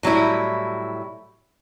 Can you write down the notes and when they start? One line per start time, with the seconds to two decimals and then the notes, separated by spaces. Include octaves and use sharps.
0.03 A2 F#3 G3 E4